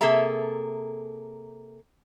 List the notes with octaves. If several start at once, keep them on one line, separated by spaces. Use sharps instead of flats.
C3 A#3 G#4 A4 E5 A#5